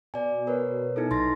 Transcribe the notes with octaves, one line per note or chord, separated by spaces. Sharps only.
B2 D5 G#5
A#4 B4 C#5
D#4 E4 A4
B1 C6 A6 A#6